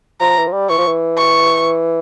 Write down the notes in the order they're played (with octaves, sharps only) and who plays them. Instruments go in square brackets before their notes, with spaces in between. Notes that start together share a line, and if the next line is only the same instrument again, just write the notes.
[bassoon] F3 [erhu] A#5
[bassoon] E3
F3
G3
[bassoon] E3 [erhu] C#6
[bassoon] F3
E3
[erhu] C#6